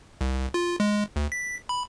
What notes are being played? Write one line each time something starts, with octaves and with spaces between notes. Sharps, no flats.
C2
F4
G#3
D2
B6
B5